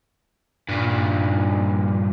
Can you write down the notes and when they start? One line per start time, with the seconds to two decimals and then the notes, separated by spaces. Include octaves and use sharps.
0.69 G2 A#2